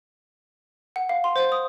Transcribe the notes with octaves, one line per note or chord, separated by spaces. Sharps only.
F#5
F5
C6
C5
D#6